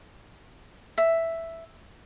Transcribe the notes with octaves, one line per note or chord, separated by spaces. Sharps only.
E5